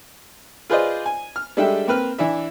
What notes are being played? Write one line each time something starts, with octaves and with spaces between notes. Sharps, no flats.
F4 G#4 B4 C5 D5 D#5
G#5
F6
G3 G#3 D4 A4 E5 G5
A#3 C4 B4 F6
E3 D4 E4 E5